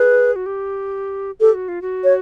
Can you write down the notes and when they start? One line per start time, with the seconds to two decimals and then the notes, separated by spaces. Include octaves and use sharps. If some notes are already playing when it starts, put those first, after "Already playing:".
Already playing: G#4 B4
0.36 F#4
0.46 G4
1.41 G4 A4
1.54 F#4
1.68 F4
1.82 F#4
2.04 C#5